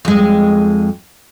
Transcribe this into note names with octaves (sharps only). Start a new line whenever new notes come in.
F2 G#3